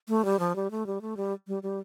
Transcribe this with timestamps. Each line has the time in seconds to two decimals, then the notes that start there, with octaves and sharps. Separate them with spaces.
0.09 A3
0.25 G3
0.39 F3
0.56 G3
0.71 A3
0.87 G3
1.01 A3
1.17 G3
1.48 G3
1.63 G3